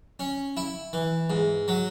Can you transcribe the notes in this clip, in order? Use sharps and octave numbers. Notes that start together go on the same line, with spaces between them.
C#4
E4
E3
G#2
F#3